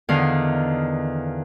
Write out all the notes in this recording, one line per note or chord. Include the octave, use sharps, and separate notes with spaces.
E2 D3 D#3 F5